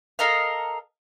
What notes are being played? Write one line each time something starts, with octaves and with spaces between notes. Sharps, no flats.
A4 A#4 D#5 F5